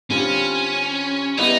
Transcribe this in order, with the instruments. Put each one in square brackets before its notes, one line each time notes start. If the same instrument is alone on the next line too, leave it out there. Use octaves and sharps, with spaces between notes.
[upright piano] D3 G3 C4 F4 [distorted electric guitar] C#4
[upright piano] G3 B3 E4 [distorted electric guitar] D#4